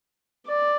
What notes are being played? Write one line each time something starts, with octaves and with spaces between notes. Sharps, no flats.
D5